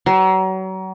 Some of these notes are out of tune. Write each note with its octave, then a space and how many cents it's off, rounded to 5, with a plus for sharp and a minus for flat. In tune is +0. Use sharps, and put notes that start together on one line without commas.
F#3 +35